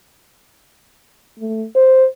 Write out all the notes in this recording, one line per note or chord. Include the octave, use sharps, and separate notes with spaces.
A3
C5